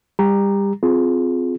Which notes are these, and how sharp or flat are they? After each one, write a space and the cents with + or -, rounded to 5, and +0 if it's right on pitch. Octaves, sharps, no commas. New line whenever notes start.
G3 +20 G4 +25 A#5 +0
C4 -10 F4 +10 G#4 +20